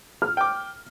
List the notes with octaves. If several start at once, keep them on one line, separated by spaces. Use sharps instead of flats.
F6
G5 D6